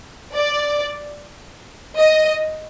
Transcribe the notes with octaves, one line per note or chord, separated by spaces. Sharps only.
D5
D#5